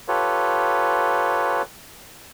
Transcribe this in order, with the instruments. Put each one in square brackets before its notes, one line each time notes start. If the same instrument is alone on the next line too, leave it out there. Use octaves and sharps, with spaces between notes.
[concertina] F4 G4 A4 B4 C#5